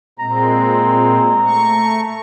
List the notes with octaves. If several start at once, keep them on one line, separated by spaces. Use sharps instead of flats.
A#2 G#3 C4 A#5
A3 C#6